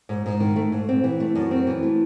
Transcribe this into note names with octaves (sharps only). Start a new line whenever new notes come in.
G#2
G#2
D#3
A3
G#2
C4
E3
A3
F#2
C4
E3
A3